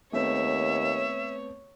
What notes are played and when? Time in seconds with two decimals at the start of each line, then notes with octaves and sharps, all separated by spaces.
0.13 D#2 A3 B3 C4 C#5 E5